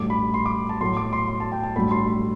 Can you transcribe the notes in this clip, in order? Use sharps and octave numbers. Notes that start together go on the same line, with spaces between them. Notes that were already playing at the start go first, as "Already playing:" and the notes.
Already playing: A1 G2 F#3 A3 D6
B5
C6
D6
A5
B1 A2 F#3 A3 C6
D6
C6
C6
A5
G5
A5
A1 G2 F#3 A3 B5
C6
B5